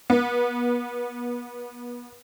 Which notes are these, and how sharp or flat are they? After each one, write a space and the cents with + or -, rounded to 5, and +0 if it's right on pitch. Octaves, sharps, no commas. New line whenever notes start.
B3 -30